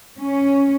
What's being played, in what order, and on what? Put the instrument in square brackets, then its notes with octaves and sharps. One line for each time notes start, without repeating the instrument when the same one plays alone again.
[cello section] C#4